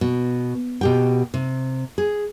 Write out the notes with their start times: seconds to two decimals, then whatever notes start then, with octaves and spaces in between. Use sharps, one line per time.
0.01 B2
0.81 B2 G4 G5
1.34 C3
1.98 G#4